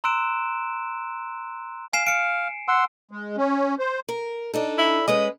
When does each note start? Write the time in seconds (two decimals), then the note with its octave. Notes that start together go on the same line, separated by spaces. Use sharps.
0.04 A#5 C6 E6 F#6 D7 E7
1.93 F5 G#5 C7 E7
2.07 F5 C#7 D7
2.68 F#5 C6 E6
3.11 G#3
3.37 C#4
3.79 C5
4.09 A#4
4.54 D4 D#4 A4
4.78 E4
5.08 G#3 C#4 B4 D#5